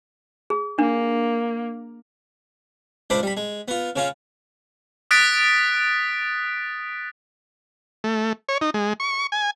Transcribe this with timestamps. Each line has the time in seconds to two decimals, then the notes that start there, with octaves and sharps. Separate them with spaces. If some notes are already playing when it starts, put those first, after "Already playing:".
0.50 G#4
0.79 A#3 D4
3.10 C#2 D4 C5 B5 C6 D6
3.23 G3 B5
3.37 G#3
3.68 B3 F4
3.96 C#3 C#4 F4
5.11 D#6 F#6 A6 B6 D7
8.04 A3
8.49 C#5
8.61 D#4
8.74 G#3
9.00 C#6
9.32 G#5